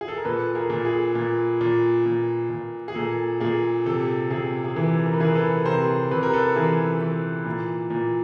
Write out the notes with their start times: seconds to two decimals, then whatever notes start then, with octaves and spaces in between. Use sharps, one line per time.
0.01 G#4
0.08 A4
0.18 A#4
0.25 A#2 A4 B4
0.55 G#4 A#4
0.70 A#2
0.85 G#4
1.15 A#2
1.61 A#2
2.06 A#2
2.50 A#2
2.88 G#4
2.95 A#2 A4
3.40 A#2 G#4
3.86 C3 A4
4.30 C3 G#4
4.64 G#4
4.76 E3 A4
5.06 A#4
5.14 B4
5.20 E3 G#4 A#4
5.35 A4 B4
5.65 C3 A#4 C5
6.11 C3 B4
6.23 A#4
6.33 A4 B4
6.56 E3 G#4 A#4
7.01 E3
7.45 A#2
7.90 A#2